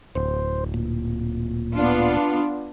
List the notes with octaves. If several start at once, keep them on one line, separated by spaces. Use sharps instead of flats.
D1 C5
A#2
B3 D4 F4